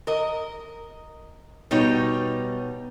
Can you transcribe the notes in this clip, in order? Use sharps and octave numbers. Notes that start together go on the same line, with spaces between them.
A#4 D#5
B2 G3 D#4 C#5